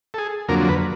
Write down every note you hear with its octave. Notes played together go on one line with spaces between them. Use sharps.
A4
G#4
F2 D3 F#3 A#3 A#4
B4